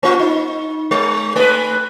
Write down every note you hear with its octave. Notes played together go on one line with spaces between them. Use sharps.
A#3 F4
D#4
G#3
A3 B4